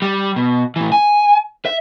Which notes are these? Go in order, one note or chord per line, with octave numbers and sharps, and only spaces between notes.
G3
B2
A2 E3
G#5
E5